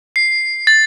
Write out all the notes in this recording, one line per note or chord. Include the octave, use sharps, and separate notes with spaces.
C7
A6